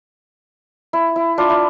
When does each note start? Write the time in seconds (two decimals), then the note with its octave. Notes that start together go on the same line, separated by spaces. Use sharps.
0.93 E4
1.16 E4
1.38 D4 F4
1.50 E4